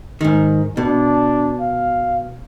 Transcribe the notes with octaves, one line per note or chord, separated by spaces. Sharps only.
G#2 D#3
B2 D4
F5